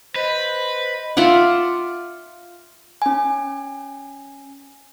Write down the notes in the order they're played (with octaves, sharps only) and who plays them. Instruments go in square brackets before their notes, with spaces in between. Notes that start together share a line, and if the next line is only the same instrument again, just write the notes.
[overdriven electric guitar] B4 [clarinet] C5 [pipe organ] D#5
[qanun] F4 D5 E5 F#5
[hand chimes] C#4 G#5